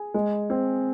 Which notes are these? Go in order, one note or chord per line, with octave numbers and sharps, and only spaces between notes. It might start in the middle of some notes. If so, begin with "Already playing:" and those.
Already playing: G#4
G#3
C4